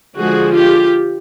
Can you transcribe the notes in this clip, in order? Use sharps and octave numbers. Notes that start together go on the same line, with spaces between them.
D3 F3 G#3 F#4 G#4
F4 G4